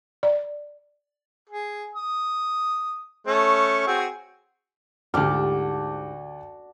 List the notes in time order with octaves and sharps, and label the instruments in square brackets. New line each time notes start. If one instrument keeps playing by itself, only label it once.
[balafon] D5
[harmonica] G#4
D#6
A3 C#4
C4 F#4 G#4
[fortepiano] D2 F6 [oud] G#2 G4 [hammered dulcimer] F#4 D5 A5